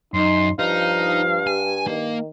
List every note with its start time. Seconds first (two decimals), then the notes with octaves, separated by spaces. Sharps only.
0.14 F#2 D#4 C6
0.59 G2 F3 D#4 F5
1.47 G4 G#5
1.87 D#3 A#3